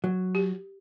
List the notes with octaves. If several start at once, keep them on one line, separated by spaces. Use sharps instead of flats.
F#3
G4